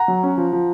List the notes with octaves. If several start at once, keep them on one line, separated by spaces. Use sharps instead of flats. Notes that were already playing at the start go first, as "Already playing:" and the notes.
Already playing: F#5 A#5
F#3
C#4
F3
F3